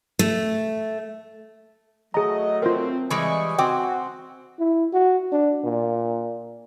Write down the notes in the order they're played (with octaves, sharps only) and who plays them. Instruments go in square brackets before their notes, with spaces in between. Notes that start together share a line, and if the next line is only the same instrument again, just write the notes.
[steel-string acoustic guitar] A3
[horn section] F#3 A3 [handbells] G#4 A#5 [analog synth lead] D#5
[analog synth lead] C4 [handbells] F4 A#4
[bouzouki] E3 G3 G#3 [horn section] D#5 G#5 [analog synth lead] C#6
[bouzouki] C4 [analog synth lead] F#4 [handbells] G5 D6
[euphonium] E4
F#4
D4
A#2